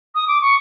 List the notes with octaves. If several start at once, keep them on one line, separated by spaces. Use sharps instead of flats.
D#6
D6
C#6